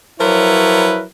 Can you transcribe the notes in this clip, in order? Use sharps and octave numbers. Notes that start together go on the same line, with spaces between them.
F3 F#3 E4 A#4 B4 C#5